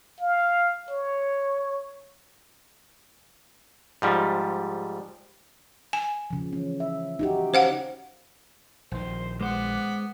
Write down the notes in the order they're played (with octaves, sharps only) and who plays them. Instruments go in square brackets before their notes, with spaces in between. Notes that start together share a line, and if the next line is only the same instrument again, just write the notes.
[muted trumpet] F5
C#5
[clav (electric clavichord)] G#2 F3 G3
[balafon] G#5
[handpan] C#3 F3
E3 C#4
E5
D#4 F#4 G4
[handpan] C#4 [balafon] C5 F5 F#5
[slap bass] A#1 D#3 [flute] C5
[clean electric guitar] G#3 C5 [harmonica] B3 [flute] D6